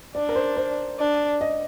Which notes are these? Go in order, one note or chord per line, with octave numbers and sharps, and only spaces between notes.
D4 D5
A#4
C5
C5
D4
D#5